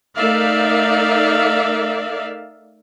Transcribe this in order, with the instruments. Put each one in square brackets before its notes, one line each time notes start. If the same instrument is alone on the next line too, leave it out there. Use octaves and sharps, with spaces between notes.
[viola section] A3 D#4 A#4 D5 E5 F5